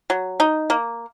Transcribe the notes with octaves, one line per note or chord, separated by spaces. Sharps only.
F#3
D#4
A#3